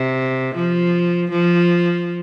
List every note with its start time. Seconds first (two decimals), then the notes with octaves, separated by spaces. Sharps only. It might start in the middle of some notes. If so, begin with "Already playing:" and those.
Already playing: C3
0.56 F3
1.31 F3